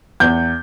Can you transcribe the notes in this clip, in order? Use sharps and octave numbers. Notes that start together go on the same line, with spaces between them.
E2 G6